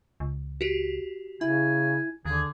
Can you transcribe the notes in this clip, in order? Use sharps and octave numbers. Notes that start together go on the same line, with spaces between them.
C#2
F#4 G4
C#3 E4 G#5
D#2 D3 G#4